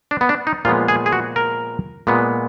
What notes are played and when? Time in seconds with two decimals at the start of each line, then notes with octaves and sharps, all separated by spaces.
0.11 D4
0.21 B3
0.29 D4
0.47 D#4
0.65 A#2 F3 G#3 B3 F4
0.88 G#4
1.06 G#4
1.12 F#4
1.36 A#4
2.07 A#2 G#3 B3